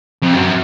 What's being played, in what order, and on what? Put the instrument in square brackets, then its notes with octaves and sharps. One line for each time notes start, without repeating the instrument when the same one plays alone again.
[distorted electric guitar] F2
F#2